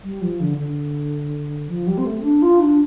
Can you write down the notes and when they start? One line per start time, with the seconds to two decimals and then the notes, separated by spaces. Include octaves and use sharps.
0.03 G3
0.22 F3
0.40 D3
0.58 D3
1.69 F3
1.87 G3
1.98 C4
2.05 A3
2.23 D4
2.42 F4
2.60 D4